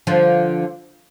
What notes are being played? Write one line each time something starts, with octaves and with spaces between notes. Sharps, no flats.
D3 F3